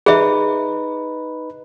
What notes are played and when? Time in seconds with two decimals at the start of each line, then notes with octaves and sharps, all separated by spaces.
0.06 D#4 G#4 B4 E5